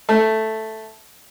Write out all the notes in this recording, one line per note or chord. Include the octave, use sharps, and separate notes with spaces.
A3